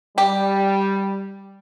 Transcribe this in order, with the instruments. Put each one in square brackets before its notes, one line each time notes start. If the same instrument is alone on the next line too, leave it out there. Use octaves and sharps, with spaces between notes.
[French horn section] G3 [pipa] G4